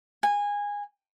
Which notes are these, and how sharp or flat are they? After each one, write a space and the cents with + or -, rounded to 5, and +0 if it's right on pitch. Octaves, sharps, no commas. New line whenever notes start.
G#5 -20